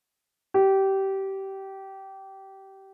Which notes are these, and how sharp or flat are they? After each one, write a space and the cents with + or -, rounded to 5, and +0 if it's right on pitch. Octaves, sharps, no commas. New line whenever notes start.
G4 -20